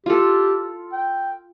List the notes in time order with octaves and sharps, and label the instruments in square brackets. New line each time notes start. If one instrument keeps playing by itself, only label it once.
[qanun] F4 A4 [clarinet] G4
[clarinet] G5